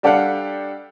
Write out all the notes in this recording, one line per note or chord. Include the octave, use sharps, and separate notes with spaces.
G3 D4 G4 A4 F5 F#5